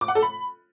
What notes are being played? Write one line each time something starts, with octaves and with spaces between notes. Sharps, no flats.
D6
F#5
A4
B5